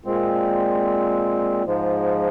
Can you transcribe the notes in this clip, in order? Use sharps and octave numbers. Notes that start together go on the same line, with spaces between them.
A#2 G#3 C4
G#2 F3 G#3